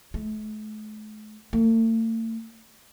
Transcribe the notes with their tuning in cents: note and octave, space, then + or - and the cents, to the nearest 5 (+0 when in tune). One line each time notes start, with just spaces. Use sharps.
A3 -45
A3 +45